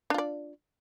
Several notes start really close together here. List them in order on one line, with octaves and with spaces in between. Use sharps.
D4 F4 D5